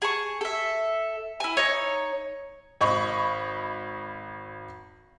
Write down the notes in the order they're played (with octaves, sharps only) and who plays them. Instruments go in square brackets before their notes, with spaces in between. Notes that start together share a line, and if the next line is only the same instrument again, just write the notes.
[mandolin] G#4 A5 C#6
A4 E5
E4 G#5
D#4 C#5
[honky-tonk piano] G#1 D#5 B5 C#6